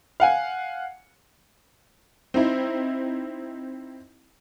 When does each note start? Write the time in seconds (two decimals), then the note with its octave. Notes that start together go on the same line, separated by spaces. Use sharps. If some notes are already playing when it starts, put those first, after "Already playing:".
0.20 F5 F#5 G#5
2.34 C4 D#4 E4